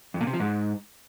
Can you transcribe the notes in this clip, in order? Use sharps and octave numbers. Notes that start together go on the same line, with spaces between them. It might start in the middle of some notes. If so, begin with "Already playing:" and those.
F2
A#2
C3
F3
G#2